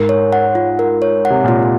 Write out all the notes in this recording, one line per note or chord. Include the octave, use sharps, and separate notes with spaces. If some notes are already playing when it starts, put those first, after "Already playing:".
Already playing: G#2 A#4
C#5
F#5
F4
A#4
C#5
F#5
C3
A#2 F4